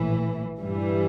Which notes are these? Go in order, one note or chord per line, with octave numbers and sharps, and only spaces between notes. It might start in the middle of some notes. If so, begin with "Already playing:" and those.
Already playing: A#1 A2 E3
G2 E3 G3